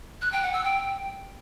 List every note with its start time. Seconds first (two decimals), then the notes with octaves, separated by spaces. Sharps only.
0.22 F#6
0.32 G5
0.43 F#5
0.53 E6
0.64 G5